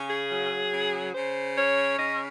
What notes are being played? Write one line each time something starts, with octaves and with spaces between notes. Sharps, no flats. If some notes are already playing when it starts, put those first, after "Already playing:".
Already playing: C#3 C#4
G#4
F#3
C#3
C#3 C5
C#4 C#5
C#3 D#5